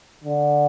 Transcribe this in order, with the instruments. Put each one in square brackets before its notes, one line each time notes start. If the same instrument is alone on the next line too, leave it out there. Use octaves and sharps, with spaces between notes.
[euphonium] D3